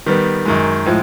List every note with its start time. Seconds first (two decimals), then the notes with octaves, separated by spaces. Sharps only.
0.06 D#3 G3 B3
0.45 F#2 D#3 G#3
0.86 A2 F3 G#3